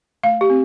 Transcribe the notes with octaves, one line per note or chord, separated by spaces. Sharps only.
A3 F5
G4
C4